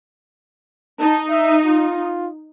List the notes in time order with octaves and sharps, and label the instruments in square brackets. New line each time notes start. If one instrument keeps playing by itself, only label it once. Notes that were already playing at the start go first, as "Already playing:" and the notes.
[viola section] D#4 [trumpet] A5
[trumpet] E5
F4